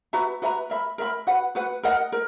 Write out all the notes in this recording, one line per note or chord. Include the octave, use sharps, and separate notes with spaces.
F#4 B4 E5 A#5
F#4 B4 E5 A#5
A#4 E5 B5
A#4 E5 B5
F#4 B4 F#5
F#4 B4 F#5
A#4 D#5 F#5
A#4